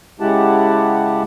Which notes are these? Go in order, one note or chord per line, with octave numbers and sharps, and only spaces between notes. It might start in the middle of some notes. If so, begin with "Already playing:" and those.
C#3 G#3 E4 G4 F#5 A5